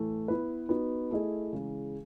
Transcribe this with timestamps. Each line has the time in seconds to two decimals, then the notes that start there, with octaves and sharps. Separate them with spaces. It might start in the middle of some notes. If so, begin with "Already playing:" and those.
Already playing: A2 E3 A3
0.28 B3 E4 B4
0.69 B3 D#4 F#4
1.11 A3 E4 G#4 D#5
1.53 C#3 E3 G#3